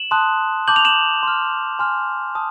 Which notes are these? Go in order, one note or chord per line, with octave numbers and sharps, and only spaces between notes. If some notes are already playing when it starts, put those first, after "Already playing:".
Already playing: E7 F#7
A5 C6 D#6 F#6
A5 D6 G6 F#7
F7
E7 F#7
C6 F6
G#5 C6 F6
A5 D#6